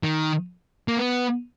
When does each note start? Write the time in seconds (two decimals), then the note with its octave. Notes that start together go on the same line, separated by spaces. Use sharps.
0.03 D#3
0.88 A#3
0.97 B3